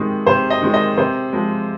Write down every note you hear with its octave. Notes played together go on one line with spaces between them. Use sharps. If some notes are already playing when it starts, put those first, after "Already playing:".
Already playing: C3 D#3 G#3
C3 C5
D#5
D#3 G#3
D#5
C3 C5
F3 G#3